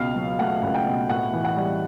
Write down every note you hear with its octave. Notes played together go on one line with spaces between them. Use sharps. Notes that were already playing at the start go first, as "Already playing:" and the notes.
Already playing: C#2 B2 F5
F#3
A3 F#5
C#2
G5
B2
A2 F#5
E3
F#5
G3